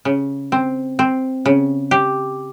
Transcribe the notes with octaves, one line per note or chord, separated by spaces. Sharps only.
C#3
C4
C4
C#3
G4